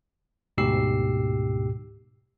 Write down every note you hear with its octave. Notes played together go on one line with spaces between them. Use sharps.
D2 G#2 B2 G4 E6 C7